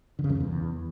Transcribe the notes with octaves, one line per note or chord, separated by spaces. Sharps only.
D3
C#3
F#2
F2
E2